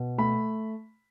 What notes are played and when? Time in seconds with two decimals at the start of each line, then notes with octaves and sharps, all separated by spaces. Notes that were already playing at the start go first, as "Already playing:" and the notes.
Already playing: B2
0.18 A3 B5